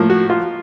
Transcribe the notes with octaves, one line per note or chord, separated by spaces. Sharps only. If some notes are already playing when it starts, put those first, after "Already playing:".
Already playing: A2 F3 A#3
F#4
F4